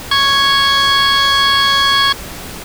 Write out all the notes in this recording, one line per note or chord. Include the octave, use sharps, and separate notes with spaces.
C#6 G#6